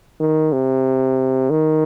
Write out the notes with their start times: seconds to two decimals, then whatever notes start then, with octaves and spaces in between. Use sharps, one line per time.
0.20 D#3
0.52 C3
1.50 D#3